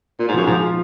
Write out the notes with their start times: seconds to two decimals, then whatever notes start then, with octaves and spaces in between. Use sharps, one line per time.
0.19 A#2 F4
0.28 G#2
0.34 F#2 F3
0.46 G#2 F3
0.63 F4